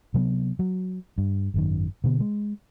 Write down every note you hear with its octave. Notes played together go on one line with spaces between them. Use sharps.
C3 F#3 G#3 B3
F#3
G2
G#1 F#2 D#3
B2 D3 B3
G#3